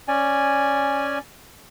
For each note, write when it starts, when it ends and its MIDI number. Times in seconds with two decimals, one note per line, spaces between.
0.08 1.18 61
0.08 1.18 74
0.08 1.18 80